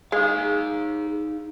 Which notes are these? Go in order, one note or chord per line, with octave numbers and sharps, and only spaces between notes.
G#3 D#4 G#4 F5